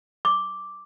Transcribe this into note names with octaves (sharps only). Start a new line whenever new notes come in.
D6